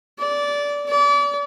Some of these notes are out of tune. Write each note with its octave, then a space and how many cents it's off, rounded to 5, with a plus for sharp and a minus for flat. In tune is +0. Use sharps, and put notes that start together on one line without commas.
D5 -20
D5 -35